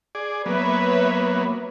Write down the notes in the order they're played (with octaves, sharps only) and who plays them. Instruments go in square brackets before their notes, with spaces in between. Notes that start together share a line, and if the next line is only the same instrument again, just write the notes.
[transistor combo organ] G#4 D5
[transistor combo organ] F#3 A#3 B3 [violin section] B4 C#5 E5